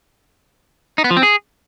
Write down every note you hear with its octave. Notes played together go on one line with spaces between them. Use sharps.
D#4
B3
F3
C4
G#4